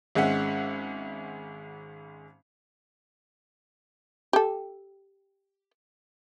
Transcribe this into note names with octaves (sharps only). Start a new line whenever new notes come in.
G#1 G#3 C#4 E5 F#5
G4 A4